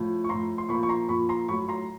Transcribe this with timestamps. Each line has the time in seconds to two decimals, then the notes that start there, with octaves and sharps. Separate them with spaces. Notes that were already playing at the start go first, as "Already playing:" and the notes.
Already playing: A2 F3
0.24 C#6
0.29 A2 F3 A#5 C6
0.58 C6
0.69 A#2 B5 C#6
0.74 F3
0.83 C#6
0.89 A#5 C6
1.09 A#2 F3 B5 C#6
1.29 A#5 C6
1.49 A2 F#3 B5 C#6
1.68 A#5 C6